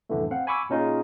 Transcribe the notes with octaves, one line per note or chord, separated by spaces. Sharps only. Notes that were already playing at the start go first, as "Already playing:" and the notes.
C2 F2 A2 D3 E3 A3
C4 F5 F#5
G#5 B5 C#6 D6 E6
A#2 C#4 D#4 F4 G#4